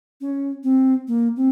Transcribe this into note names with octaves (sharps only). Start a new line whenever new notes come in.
C#4
C4
A#3
C4